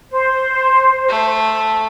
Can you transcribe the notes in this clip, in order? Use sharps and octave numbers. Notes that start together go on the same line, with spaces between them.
C5
A3